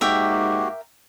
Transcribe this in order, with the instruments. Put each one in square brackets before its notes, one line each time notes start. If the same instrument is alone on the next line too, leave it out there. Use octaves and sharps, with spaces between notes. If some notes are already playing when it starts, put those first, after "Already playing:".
[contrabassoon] G#2 [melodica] A#3 F#4 G4 [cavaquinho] A#4 E5 G5